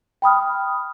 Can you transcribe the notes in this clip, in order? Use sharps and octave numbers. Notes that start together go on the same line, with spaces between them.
G5 B5 D#6 F6